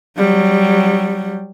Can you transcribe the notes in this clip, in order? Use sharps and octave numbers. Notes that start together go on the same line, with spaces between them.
F#3 G3